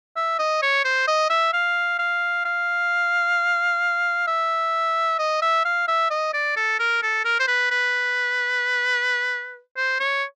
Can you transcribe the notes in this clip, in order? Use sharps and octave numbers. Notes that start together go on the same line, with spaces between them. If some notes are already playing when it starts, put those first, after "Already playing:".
E5
D#5
C#5
C5
D#5
E5
F5
F5
F5
E5
D#5
E5
F5
E5
D#5
D5
A4
A#4
A4
A#4
C5
B4
B4
C5
C#5